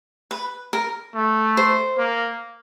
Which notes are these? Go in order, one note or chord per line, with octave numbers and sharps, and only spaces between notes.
B4
A#4
A3
C5
A#3